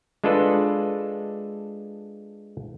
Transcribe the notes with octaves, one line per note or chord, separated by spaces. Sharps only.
G#3 D4 F4 A4 B4